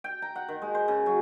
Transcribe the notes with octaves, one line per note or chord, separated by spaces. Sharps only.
G5
A#5
F#5
D#3
G#3
C5
C#3
F#3